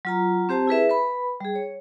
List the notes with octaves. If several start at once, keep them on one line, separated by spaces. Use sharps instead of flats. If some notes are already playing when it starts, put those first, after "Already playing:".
F#3 F4 A#5
C4 G4 C5 A5
E4 G#4 B4 E5
B4 B5
G3 G#4
C#5